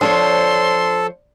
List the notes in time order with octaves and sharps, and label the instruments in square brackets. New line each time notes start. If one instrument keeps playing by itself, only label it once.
[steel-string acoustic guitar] F3 C5 C#5 [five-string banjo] D4 [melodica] A4 [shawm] C6